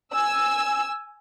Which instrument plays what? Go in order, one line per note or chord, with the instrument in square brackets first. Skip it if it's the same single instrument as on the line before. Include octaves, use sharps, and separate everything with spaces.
[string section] G#5 E6